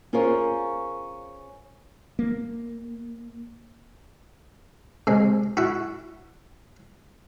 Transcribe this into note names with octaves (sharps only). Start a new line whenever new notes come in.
C#4 F4 G#4 A#4 C5 C#5
A#3
C3 G#3
E4 F#4